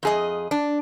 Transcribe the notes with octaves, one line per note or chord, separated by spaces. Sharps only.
F2 G#4 D#5
D4